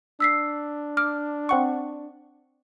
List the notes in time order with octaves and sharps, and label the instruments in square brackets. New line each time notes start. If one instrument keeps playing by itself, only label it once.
[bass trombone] D4 [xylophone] E6 B6 C7
[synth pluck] D6 [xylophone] F6
[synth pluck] C4 F#5 C#6